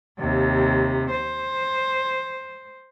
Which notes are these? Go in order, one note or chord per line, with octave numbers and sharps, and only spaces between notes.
D#2 C3
C5